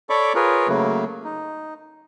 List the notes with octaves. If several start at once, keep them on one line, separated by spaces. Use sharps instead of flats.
A4 C#5 D5 B5 C#6 D6
F4 G#4 A#4 B4 C#5
C#3 F#3 A3 A#3
D#4